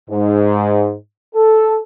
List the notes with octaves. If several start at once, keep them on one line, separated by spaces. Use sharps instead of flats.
G#2
A4